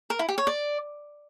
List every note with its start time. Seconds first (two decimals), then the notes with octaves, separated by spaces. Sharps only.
0.10 A#4
0.19 E4
0.29 G4
0.38 C#5
0.47 D5